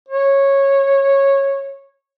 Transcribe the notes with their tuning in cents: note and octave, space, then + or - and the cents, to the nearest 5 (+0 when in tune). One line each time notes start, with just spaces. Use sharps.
C#5 -10